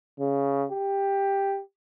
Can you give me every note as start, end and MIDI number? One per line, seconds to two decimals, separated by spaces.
0.20 0.66 49
0.72 1.61 67